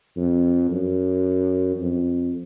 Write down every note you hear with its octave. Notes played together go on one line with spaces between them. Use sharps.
F2
F#2
F2